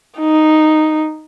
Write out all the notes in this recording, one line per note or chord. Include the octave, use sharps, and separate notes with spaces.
D#4